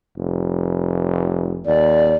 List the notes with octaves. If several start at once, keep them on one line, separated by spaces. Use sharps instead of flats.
F1
D#2 D5